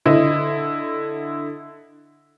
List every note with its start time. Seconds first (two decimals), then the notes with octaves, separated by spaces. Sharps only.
0.05 D3 E4 D#5